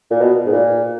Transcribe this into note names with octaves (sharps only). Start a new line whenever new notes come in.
A#2
B2
G#2
A#2